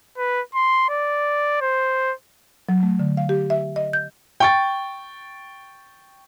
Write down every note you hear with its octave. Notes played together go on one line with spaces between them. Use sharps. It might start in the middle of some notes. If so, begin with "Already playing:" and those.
B4
C6
D5
C5
F#3
A3
D3
F5
G4
E5
D#5
G6
G5 C#6 A6